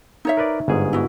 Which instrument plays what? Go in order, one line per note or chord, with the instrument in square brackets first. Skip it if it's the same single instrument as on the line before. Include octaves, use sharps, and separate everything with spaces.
[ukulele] D#4 C#5 E5
[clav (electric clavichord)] A#4 B4 D5
G1 G#2 G#4
[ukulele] E4 F#4